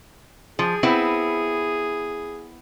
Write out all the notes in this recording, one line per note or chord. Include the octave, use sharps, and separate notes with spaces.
F3 G#4
B3 C4 E4